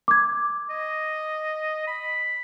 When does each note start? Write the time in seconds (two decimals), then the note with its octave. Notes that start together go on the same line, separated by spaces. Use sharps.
0.08 D6 G#6
0.70 D#5
1.87 B5